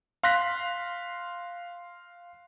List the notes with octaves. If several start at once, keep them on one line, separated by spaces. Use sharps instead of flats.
F5 C6 F#6 A#6 B6